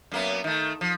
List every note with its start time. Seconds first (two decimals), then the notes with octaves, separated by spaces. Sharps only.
0.12 F#2 A#3 B3
0.44 D#3 A3
0.81 F3